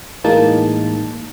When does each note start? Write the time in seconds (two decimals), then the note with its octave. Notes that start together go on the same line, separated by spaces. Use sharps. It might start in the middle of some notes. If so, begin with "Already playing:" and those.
0.24 A2 E3 G#3 A#3 D#4 A5